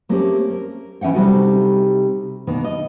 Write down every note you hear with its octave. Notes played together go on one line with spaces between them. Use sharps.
A3 A#3 C4 C#4 G4 G#4
A#4
E3 C#4 E5 F#5 G5
C3 G3 B3 D#4 F#4 A4
B2 D#3 A#3 D4 B4
D#5